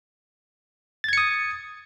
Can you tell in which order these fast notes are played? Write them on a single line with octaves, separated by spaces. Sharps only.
A6 G#6 C#7 D#6